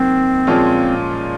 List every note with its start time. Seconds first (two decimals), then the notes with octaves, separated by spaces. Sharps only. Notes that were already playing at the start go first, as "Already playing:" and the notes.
Already playing: C3 D#3 F#3 A#3 C4
0.47 A#2 F3 G#3 C#4 F4